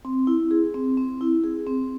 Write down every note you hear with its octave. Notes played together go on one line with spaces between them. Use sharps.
C4
E4
G#4
C4
C4
E4
G#4
C4